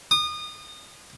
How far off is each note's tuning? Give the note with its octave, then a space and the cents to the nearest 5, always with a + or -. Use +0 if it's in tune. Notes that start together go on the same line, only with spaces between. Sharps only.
D#6 -30